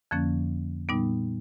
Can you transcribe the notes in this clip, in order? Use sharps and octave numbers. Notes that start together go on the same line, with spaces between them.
F2 D3 F3 A#3 C#4
A#2 G3 B3 D#4